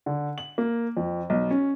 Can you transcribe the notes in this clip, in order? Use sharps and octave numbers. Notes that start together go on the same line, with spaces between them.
D3
F#7
A#3
F2
B1
C#4